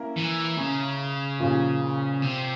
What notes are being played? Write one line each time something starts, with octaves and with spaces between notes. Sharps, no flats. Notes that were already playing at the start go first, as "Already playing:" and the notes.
Already playing: A#3 C#4 E4 A#4
E3
C#3
A#2 F3 A#3 C#4 F4
C3